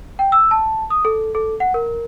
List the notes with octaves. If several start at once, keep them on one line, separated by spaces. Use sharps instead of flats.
G5
E6
A5
D#6
A4
A4
F#5
A#4